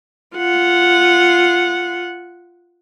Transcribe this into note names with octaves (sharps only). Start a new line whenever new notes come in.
F4 F#5